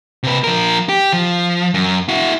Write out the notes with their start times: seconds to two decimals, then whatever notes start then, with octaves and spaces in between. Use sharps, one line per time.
0.23 C3 B4
0.44 F3 A#4
0.89 G4
1.13 F3
1.74 F#2
2.08 E4 F#4